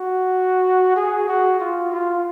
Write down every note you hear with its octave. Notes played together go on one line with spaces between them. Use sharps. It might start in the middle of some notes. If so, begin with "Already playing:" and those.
Already playing: F#4
G#4
F#4
F4
F4